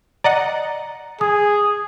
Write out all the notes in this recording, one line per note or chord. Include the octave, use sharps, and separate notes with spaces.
D5 D#5 F#5 A#5
G#4 D#6